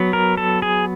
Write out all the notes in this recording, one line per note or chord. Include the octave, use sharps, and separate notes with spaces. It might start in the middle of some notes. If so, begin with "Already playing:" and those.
Already playing: F#3 B3
A#4
A4
G#4